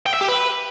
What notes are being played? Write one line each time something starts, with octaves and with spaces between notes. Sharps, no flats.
G5
E5
G4
B4